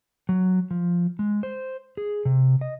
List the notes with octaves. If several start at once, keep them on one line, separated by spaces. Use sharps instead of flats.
F#3
F3
G#3
C5
G#4
C3
D#5